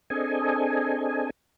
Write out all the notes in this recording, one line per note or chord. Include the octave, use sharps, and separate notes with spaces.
C4 D4 G#4 A4 D#5 G#5